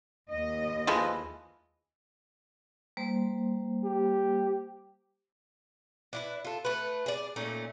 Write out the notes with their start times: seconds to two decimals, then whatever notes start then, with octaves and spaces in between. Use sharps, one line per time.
0.29 D#2 D#5
0.87 E3 F3 G#3
2.97 G3 A#3 C5
3.85 G4
6.13 D4 E4 B4
6.45 F4 A4
6.65 A3 B4
7.06 G#4 D5
7.36 A#2 A3 C#4 D#4